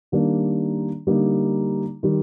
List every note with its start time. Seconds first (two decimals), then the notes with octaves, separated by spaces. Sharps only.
0.12 D#3 G3 A#3 D4
1.07 D3 G3 A#3 D#4
2.03 D#3 G3